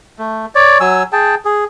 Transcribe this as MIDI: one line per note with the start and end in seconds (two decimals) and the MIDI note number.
0.19 0.46 57
0.55 0.78 73
0.55 0.78 74
0.80 1.03 54
0.80 1.03 80
0.80 1.03 88
1.13 1.35 68
1.13 1.35 79
1.13 1.35 81
1.45 1.64 68